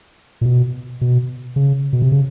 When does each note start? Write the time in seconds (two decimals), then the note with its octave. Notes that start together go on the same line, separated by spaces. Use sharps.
0.41 A#2
0.46 B2
1.01 B2
1.56 C#3
1.93 B2
2.02 C3
2.12 C#3